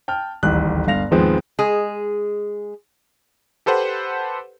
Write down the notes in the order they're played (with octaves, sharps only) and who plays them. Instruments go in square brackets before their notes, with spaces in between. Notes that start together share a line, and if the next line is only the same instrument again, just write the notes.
[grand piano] G5 A5 F6
D1 A1 D#2 G3 F#6
G1 G2 F5 A#6 F7
D#2 G#2 F3 G#3 B3 C4
[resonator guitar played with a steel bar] G#3 G#4
[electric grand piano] G4 A4 B4 C5 F#5